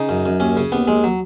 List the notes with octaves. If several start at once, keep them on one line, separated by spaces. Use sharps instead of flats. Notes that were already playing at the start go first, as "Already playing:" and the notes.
Already playing: C#3 D#4
F#2
F#2
D#2 C#4
C#3
D#2 B3
D#2 G#3
F#3